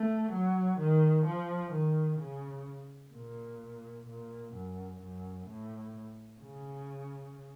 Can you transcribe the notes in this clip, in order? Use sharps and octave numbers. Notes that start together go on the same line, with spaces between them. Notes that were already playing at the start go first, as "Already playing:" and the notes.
Already playing: A3
F#3
D#3
F3
D#3
C#3
A#2
A#2
F#2
F#2
A2
C#3